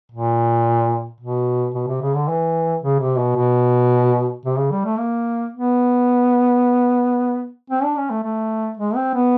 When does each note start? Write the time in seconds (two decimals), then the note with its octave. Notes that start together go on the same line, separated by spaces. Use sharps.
0.12 A#2
1.21 B2
1.74 B2
1.88 C3
2.02 C#3
2.15 D3
2.28 E3
2.82 C#3
3.00 C3
3.19 B2
3.36 B2
4.45 C3
4.58 C#3
4.72 G3
4.85 A3
4.98 A#3
5.53 B3
7.70 C4
7.83 D4
7.97 C#4
8.10 A3
8.23 A3
8.77 G#3
8.96 C4
9.15 B3